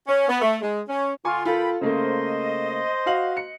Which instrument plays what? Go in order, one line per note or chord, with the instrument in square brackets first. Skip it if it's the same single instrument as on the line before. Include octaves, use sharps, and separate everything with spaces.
[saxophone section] C#4
B3
A3
G#3
C#4
[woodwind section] D3 F4 [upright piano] G#5 C#6 D6
[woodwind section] D#3 G5 B5 [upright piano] F4 A4
[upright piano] C#3 A3 A#3 [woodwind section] C5 D#5
[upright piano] F#4 F5 F#7
C#7